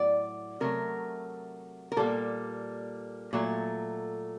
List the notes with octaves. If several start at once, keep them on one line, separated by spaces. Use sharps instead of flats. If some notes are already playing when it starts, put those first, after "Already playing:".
Already playing: A2 F#3 D5
C3 F#3 A3 A#4
A#4
A#2 G3 A#3 A4
A#2 F#3 A3